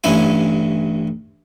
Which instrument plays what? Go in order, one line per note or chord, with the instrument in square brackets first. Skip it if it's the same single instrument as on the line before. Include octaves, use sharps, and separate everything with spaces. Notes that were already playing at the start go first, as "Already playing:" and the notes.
[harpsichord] A1 G2 C#4 E4 G#5